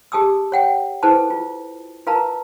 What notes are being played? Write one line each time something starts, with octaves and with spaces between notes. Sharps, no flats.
G4 G#4 A5 D#6 E6
C#5 F#5 G5
E4 G#4 A4 B4 C5 A5
F4
F4 A#4 B4 F5 A5 A#5